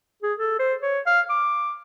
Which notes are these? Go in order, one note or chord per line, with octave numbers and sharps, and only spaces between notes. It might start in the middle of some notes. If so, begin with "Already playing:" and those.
G#4
A4
C5
C#5
F5
D6